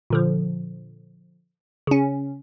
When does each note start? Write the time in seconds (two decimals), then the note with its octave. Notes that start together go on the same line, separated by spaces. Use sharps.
0.10 A#2 D3 F3
1.87 C#3 C#4